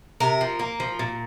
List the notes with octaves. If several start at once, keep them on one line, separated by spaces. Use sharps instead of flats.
C3 A#4
F3
A#3
F3
A#2